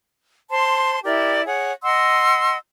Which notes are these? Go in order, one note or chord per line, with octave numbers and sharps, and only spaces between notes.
C5 A5 C6
E4 G4 A#4 D5
G#4 C#5 F#5
D#5 F#5 C6 E6